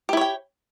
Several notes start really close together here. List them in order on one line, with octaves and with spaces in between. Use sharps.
G4 E4 C#5 G5